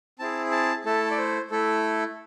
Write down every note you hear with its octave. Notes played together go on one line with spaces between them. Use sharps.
C4 E4 G#4 A5
A5
A3 E4 A4 A5
D5
C5
A3 E4 A4